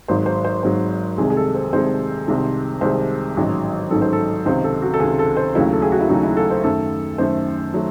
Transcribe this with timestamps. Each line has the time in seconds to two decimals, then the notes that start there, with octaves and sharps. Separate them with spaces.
0.08 G#1 G#2 F#3 C5
0.26 C5
0.45 C5
0.63 G#1 G#2 F#3 C5
1.18 C2 C3 D#3 G#3 G#4
1.30 G#4
1.37 A4
1.55 C5
1.72 C2 C3 D#3 G#3 C5
2.27 C2 C3 D#3 G#3
2.81 C2 C3 D#3 G#3 C5
3.37 A1 G#2 D#3 F#3
3.91 A1 G#2 D#3 F#3 A4
4.02 C5
4.13 A4
4.46 C#2 C3 D#3 C5
4.64 A4
4.82 F#4
4.94 A4
5.00 C#2 C3 D#3 G#4
5.19 A4
5.37 C5
5.55 D#2 C#3 F#3 A3 E4
5.73 A4
5.82 G#4
5.92 F#4
6.00 E4
6.09 D#2 C#3 F#3 A3 D#4
6.23 E4
6.37 A4
6.51 C5
6.64 F#2 D#3 A3 A4
7.18 F#2 D#3 A3 C5
7.74 D#3 F#3 A3